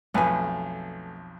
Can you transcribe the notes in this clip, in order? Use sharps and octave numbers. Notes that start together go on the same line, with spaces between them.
B1 F2 A3 B4 G#5